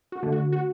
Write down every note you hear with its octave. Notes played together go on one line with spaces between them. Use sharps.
F#4
D3 A3
F#4
F#4